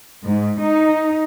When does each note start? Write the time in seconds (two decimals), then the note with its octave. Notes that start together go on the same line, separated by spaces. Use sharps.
0.25 G#2
0.61 D#4